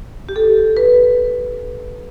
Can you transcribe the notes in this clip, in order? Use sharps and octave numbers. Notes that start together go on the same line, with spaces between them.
G4
A4
B4